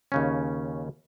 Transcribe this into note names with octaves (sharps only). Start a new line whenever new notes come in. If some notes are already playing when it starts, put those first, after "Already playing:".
D#2 C#3 C#4